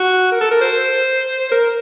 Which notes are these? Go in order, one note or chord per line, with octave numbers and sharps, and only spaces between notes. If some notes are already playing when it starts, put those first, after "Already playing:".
Already playing: F#4
A#4
A4
A#4
C5
A#4